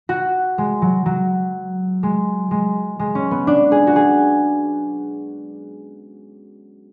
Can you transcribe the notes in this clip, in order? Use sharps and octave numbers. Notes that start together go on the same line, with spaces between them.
F#4
G#3
F#3
F#3
G#3
G#3
G#3
C#4
B3
D4
G#4
F#4
G#4